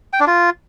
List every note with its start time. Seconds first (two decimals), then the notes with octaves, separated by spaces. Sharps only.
0.13 G5
0.20 D4
0.27 F4